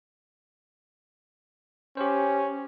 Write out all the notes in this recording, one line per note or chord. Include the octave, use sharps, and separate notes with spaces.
C#4 G4 C5